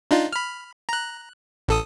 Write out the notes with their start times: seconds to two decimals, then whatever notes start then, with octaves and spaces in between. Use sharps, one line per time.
0.11 D4 D#4 F4
0.33 B5 F6
0.89 A#5 F#6
1.68 A1 A4 D#6